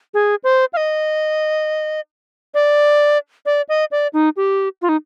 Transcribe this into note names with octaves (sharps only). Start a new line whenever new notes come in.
G#4
C5
F5
D#5
D5
D5
D#5
D5
D#4
G4
F4
D#4